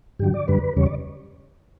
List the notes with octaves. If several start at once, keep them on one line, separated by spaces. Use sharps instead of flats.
G2 D3 F#3 G4
D5
F#2 D3 G3 B4
E2 C#3 G3 C#5
D5